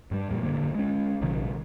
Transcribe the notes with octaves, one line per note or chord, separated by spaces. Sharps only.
G2 G3
F2 A#2 G3
G1 F#2 D3 A#3
G#3 C#4
A#1 C3 D#3 F#3